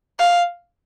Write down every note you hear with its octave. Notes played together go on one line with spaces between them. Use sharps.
F5